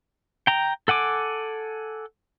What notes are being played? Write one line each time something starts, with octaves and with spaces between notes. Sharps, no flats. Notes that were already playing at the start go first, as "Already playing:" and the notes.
G5 A#5
A4 F#5 G#5 D6